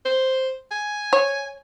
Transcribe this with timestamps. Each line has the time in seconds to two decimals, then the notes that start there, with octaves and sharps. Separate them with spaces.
0.05 C5
0.72 G#5
1.13 C#5